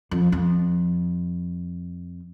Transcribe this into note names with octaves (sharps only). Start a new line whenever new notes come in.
F2
F2